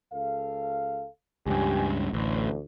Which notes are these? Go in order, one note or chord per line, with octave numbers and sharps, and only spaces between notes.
C#2 A4 F5
C#2 G2 G4 G#5
A1 D2